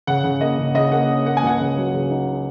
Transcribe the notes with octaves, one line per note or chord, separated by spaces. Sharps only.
C#3 F#5
C#3
A#3 D#5
C#3
C#3 D#5
A#3 F#5
C#4
A#3 F#5
G#5
C#2 F#5
C#3
F#3
C#3
D#4